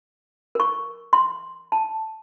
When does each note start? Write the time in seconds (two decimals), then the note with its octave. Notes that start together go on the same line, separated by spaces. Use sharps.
0.55 A#4 C#6
1.13 C6
1.72 A5